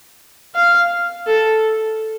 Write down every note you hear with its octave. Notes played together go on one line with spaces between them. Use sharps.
F5
A4